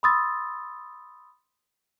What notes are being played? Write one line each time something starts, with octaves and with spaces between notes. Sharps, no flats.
B5 C6 D#6 E6 A6